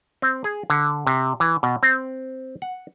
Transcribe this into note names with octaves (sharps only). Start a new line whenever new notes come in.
C4
G#4
D3
C3
E3
B2
C4
F#5